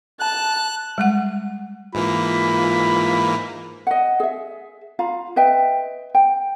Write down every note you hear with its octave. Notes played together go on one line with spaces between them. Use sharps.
A5 F#6
G3 G#3 F#5
G#2 E3 A#3 F4 B5
D#5 F#5
G#4 E5
F4 F5 A#5 B5
B4 D#5 E5 G5
G5